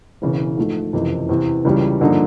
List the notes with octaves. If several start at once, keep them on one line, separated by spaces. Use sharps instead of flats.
E1 E2 C#3 E3
G#2 F3 A3
F#1 F2 C3 E3
E2 C3 E3
C#2 C#3 E3 G3
G2 D3 F3 A#3 D#4